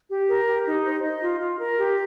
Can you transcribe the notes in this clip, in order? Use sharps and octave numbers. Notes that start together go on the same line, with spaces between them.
G4
A#4
G4
D#4
C5
D#5
F4
F4
A#4
G4